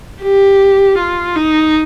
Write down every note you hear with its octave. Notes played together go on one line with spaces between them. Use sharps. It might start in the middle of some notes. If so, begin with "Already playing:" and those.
G4
F4
D#4